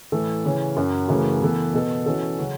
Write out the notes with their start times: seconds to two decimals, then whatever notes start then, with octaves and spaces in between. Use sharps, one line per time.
0.12 A2 E3 A3 E4 A4
0.45 C#3 E3 C#4
0.76 F#2 F#3 C#4
1.08 F#2 C#3 E3 A3
1.42 E3 B3 A4
1.73 B2 B3 A4
2.06 E3 C#4 F#4 A4
2.38 C#3 F#3 C#4 F#4